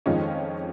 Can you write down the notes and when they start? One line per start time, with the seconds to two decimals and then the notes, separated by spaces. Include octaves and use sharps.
0.06 F2 D#3 G#3 C#4 F4